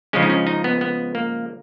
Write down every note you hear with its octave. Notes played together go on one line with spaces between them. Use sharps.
C#3 F3 G#3 C#4
D#4
C#4
D#4
B3
B3
A#3